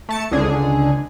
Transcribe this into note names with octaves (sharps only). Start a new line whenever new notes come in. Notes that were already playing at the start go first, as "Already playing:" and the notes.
A3 A5 C#7
C#2 D3 G#4